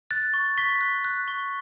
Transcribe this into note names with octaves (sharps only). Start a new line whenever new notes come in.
F#6 A6
C#6
C#6 B6
F#6
F#6
C#6